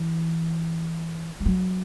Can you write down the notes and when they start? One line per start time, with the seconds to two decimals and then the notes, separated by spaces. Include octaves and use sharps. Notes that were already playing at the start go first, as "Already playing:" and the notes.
Already playing: E3
1.40 G3
1.46 F#3